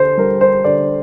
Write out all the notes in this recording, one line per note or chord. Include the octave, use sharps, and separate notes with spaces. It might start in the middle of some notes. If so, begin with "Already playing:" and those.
Already playing: D3 C5
G3 A#4
C5
D3 D5